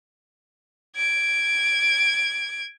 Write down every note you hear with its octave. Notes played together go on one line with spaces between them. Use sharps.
G#6 D7